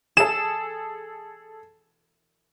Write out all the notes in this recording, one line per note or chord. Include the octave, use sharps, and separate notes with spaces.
G#4 A4 E7